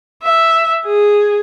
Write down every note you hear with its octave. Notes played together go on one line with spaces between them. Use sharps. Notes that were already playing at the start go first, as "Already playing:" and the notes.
E5
G#4